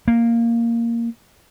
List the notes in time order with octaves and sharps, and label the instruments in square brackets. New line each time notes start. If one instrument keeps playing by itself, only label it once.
[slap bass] A#3